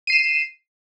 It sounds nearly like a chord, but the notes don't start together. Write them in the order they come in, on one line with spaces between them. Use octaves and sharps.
D#7 C7 E7